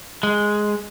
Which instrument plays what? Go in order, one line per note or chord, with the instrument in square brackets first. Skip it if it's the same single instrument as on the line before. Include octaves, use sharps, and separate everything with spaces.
[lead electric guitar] G#3